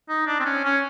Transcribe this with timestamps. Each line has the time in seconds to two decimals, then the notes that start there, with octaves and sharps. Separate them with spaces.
0.09 D#4
0.27 D4
0.40 C4
0.45 C#4
0.64 C#4